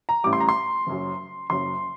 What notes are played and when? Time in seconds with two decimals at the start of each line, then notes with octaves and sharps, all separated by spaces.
0.09 A#5
0.24 A1 A2 G3 D6
0.33 C6
0.40 A#5
0.49 C6
0.87 F#1 F#2 F#3
1.50 F#1 F#2 F#3 C6